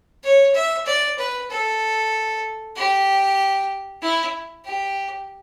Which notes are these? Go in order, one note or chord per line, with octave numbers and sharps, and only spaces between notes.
C#5
E5
D5
B4
A4
G4
E4
G4